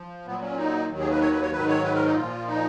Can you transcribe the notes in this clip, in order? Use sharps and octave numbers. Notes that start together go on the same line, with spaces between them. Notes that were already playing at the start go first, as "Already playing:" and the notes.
Already playing: F3
A#2 F#3 B3
C#4
D#4
D#2 D#3 F#3
G#4
B4
C#5
B4
C#5
G#2 D#3 F#3 B4
C#5
B4
A#4
D#4
A#2 F3 F4
D#4